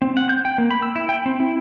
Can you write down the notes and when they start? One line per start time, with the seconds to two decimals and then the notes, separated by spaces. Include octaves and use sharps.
0.02 C4
0.17 F#5
0.29 G6
0.45 G5
0.58 A#3
0.71 B5
0.82 E6
0.96 E4
1.09 G5
1.26 C4
1.40 E4